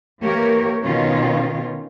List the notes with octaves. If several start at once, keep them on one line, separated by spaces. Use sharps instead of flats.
E3 A#3 G4 A#4 C#5
B2 D#3 C#4 F4